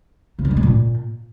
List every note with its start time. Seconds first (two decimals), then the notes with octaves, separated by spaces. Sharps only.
0.39 C#3
0.45 F#3
0.51 G#3
0.57 A2
0.63 A#2